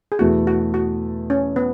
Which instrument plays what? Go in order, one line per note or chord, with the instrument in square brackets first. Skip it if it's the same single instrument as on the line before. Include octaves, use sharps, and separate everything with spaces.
[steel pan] G#4
[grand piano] E2 B2 A3 E4 A4 [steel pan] F#4
[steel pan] F#4
F#4
C#4
B3